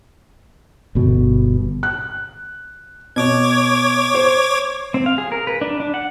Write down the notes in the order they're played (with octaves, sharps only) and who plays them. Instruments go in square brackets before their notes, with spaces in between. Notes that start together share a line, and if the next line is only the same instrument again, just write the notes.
[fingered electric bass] G1 B2
[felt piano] F#6
[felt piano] B2 [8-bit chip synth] C#5 D6 G#6
[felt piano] C5
[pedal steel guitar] C4
F5
G#4
A#4
B4
D4
D4
F#5